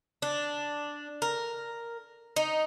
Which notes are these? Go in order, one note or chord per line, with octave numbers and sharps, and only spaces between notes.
D4
A#4
D#4